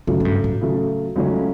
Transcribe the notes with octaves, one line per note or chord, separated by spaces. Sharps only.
F#2 C#3 F#3 A3
A2
G2
A2
C#3 F#3 A3
C#2 C#3 F#3 A3 C#4